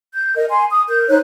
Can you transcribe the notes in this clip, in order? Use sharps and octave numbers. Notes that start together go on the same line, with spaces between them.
G6
A#4 D#5
G#5 C6
D#6
A#4 G6
D#4 C5 C#5 F#6